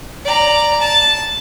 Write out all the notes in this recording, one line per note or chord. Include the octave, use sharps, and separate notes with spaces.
D5 A#5
A5